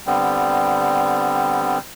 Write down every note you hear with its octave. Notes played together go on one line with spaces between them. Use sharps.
D3 G3 B3 C4